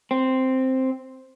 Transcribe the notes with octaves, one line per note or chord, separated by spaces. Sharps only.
C4